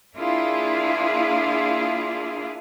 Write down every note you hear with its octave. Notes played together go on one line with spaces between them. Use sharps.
A#3 D4 E4 F4 G#4